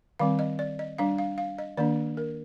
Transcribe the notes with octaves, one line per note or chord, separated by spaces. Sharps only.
D#3 G3 C4 F5
D#5
D5
D#5
G3 D4 F5
F5
F5
D#5
D#3 A#3 D4 D5
A#4